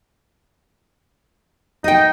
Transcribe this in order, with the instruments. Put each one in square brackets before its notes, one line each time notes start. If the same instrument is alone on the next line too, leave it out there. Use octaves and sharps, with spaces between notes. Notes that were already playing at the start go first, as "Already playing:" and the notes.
[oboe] D#4 [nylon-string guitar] D#5 G5